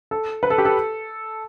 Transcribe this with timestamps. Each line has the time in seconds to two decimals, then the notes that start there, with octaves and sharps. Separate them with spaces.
0.11 A4
0.43 B4
0.50 A4
0.58 G4
0.65 A4